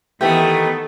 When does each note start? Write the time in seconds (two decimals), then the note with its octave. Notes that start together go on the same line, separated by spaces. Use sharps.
0.21 D#3 E3 A3 B3 G4 A4